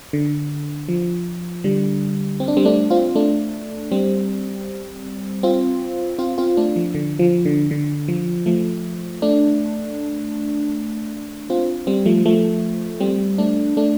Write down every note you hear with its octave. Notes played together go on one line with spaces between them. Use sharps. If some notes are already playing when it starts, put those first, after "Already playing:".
D3
F3
D3 G3
C4
D4
G3 C4
A3 D4
C4 F4
A3 D4
G3 C4
C4 F4
C4 F4
C4 F4
A3 D4
F3
D3
F3
D3
D3
F3
F3 A3
A3 D4
C4 F4
G3 C4
F3 A3
F3 A3
G3 C4
A3 D4
A3 D4